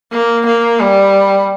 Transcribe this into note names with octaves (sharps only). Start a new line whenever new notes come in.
A#3
A#3
G3